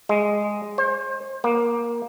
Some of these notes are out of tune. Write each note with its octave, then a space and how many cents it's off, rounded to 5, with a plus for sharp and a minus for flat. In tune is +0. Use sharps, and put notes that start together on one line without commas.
G#3 -5
C5 +30
A#3 +15